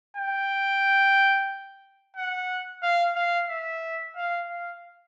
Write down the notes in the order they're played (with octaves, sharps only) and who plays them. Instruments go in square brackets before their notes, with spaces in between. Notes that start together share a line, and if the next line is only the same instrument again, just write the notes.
[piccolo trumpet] G5
F#5
F5
F5
E5
F5
F5